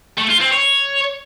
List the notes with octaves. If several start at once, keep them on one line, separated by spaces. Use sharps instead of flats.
A3
F4
C4
C#5